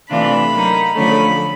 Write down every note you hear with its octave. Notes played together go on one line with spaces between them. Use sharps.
C3 E3 A3 D4 F4 B5
F#3 A#3 D#4
D3 F3 A3 C#4 B5